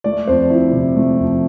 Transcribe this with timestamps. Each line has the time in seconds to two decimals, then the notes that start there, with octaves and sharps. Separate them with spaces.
0.04 A3 D5
0.27 F2 C5
0.50 F3 E4
0.72 C3
0.96 A3
1.18 F2